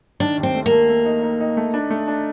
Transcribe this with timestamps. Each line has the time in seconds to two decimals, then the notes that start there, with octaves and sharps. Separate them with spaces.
0.20 D#3 D4
0.37 D#2
0.43 C4
0.55 A3
0.66 A#3
0.71 A3
0.89 A3
1.05 D#4
1.22 D#4
1.40 D#4
1.57 A3
1.74 D4
1.90 A3
2.08 D4